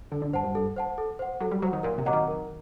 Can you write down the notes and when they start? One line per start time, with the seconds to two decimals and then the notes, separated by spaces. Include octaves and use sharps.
0.12 D3 A4
0.22 D3
0.33 G2 C5 F#5 A5
0.44 G2
0.55 G2 A4
0.76 C5 F#5 A5
0.98 A4
1.19 C5 F#5
1.40 F#3 A4
1.51 G3
1.62 F#3 C5 F#5
1.73 D#3
1.83 A#2 A#4
1.98 C3
2.05 F#3 D#5 F#5 A#5 D6
2.13 D#3
2.27 A#4